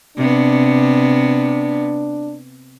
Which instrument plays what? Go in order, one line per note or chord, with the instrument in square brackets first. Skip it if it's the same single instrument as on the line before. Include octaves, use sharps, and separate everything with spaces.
[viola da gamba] C3 B3 [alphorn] D4